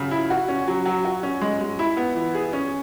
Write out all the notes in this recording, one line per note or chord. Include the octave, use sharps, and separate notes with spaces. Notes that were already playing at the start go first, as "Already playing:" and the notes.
Already playing: C#3 F#3
E4
F#4
C#4
F#3
F#3
F#4
C#4
G#3
G#3
E4
B3
E3
G#4
C#4